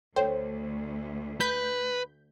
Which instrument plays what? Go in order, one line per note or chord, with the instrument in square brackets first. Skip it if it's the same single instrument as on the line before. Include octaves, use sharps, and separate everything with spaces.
[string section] D2 [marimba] A4 C#5 G5 [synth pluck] C5
[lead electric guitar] B4 [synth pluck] G6 B6